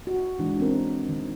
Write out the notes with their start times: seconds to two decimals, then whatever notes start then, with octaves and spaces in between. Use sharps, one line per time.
0.07 F#4
0.39 E3 G#3 D4
0.60 C4 C#4 A#4
1.09 D#3